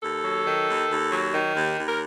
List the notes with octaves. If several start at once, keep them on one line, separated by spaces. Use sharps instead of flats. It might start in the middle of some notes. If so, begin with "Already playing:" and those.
D#2 A4
F#3
D#3
D#2
D#2
F#3
D#3
D#2
D#2
A#4